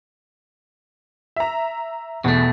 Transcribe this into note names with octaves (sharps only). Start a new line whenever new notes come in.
E5 A#5
E2 B2 A3